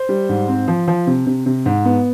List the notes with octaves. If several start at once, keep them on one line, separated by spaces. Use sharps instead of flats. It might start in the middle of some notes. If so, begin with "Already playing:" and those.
Already playing: C5
G3
G#2
C4
F3
F3
C3
C3
C3
G#2
B3